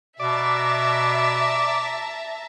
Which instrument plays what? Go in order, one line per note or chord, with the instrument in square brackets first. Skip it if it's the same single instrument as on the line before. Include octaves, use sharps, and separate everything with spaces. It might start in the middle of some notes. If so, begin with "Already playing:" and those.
[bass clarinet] B2 [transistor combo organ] D5 [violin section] E5 A5 A#5